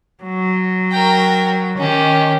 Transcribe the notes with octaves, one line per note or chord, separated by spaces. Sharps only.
F#3
A#4 G5
D#3 C#4 G4